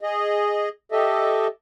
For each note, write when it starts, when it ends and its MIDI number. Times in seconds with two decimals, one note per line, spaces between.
0.01 0.69 68
0.01 0.69 75
0.92 1.47 67
0.92 1.47 69
0.92 1.47 75
0.92 1.47 76